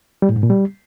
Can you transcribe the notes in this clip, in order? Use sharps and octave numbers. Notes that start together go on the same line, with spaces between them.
G3
A2
G#2
A#2
G3